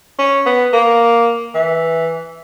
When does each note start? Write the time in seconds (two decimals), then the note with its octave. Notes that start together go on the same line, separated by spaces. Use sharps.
0.19 C#4
0.46 B3
0.73 A#3
1.55 E3